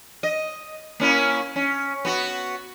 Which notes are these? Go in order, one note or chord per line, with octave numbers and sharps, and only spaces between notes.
D#5
A#3 C#4 E4
C#4
B3 F#4